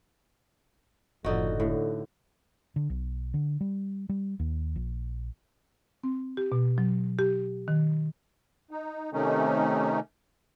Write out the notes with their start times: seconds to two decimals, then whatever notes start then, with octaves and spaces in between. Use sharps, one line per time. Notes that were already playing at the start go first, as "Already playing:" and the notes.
1.24 F#1 A2 D3 F3 D#4 F#4
1.60 A2 D3
2.76 D3
2.90 B1
3.34 D3
3.61 G3
4.09 G3
4.39 D#2
4.76 A#1
6.03 C4
6.37 G4
6.52 B2
6.78 F#3
7.19 G4
7.68 D#3
8.71 D#4
9.13 C3 D#3 A3 C#4 D#4